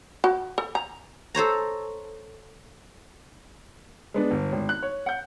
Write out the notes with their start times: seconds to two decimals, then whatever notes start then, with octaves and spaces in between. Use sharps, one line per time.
0.24 F#4
0.58 A4
0.75 A#5
1.35 A4 C5 C#5 A#5
4.14 G#3 B3 D4
4.31 G1
4.52 G#1
4.69 F#6
4.82 C#5
5.06 F#5 G6